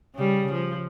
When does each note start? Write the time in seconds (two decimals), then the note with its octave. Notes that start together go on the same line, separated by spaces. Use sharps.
0.16 C#3 G3
0.53 F3